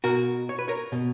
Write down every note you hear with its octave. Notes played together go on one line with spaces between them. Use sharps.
B2 F#4 A#4
C#5
B4
A#4 C#5
B2